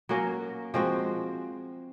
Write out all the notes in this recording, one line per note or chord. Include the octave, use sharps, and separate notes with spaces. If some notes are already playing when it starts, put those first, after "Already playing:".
F#3 A#3 C#4
F3 G#3 C4 F#4